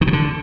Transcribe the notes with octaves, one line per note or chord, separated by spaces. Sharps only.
D#3
B2
D3